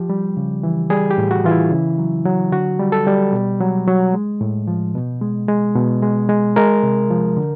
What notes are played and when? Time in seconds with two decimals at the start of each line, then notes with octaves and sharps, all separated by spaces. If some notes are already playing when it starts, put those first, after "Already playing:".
Already playing: F3 G4
0.10 G3
0.37 C#3
0.63 E3
0.90 G3 G#4
1.11 G4
1.18 A2
1.31 F#4
1.45 E3 F4
1.51 E4
1.71 C#3
1.98 F#3
2.25 F#3
2.52 D3 F#4
2.80 G3
2.92 A4
3.07 G3
3.33 B2
3.60 F#3
3.87 F#3
4.14 G#3
4.41 A2
4.67 F3
4.95 B2
5.22 G#3
5.48 G#3
5.76 B2
6.02 G#3
6.29 G#3
6.56 G#3 A#4
6.83 C3
7.10 F3
7.37 D3